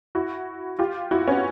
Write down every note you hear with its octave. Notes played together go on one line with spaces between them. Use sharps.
E4 F#4
F4 G4
E4 F#4
B3 C#4